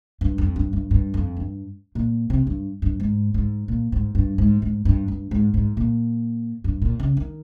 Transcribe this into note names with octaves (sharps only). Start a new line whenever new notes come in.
G2
F2
G2
G2
G2
F2
G2
A#2
C3
G2
G2
G#2
G#2
A#2
G#2
G2
G#2
G#2
G2
G2
G#2
G#2
A#2
G2
A#2
C#3
D#3